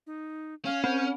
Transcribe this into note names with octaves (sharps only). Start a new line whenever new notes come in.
D#4
C#4 F5
C4 C5